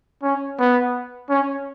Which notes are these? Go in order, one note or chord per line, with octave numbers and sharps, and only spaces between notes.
C#4
B3
C#4